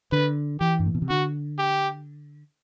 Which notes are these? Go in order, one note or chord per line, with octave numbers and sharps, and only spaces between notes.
D3 B4
E3 G4
G2
A2
B2
C3
D3 F#4
G4